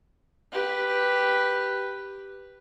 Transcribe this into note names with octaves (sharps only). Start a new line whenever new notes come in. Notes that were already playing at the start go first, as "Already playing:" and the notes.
G4 B4